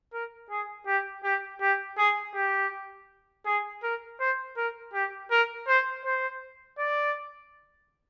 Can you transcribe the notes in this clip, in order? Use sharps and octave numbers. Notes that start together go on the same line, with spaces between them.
A#4
G#4
G4
G4
G4
G#4
G4
G#4
A#4
C5
A#4
G4
A#4
C5
C5
D5